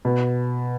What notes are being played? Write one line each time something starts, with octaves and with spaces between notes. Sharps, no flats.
B2